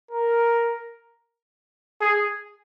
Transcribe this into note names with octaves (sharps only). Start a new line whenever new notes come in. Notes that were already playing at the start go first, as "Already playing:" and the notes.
A#4
G#4